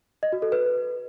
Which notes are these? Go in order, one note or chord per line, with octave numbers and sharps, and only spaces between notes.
D#5
F#4
A4
B4